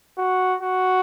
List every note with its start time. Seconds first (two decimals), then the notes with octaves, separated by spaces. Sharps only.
0.18 F#4
0.61 F#4